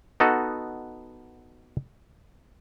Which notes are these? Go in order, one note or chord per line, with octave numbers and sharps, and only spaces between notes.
B3 D#4 F#4 A4 D#5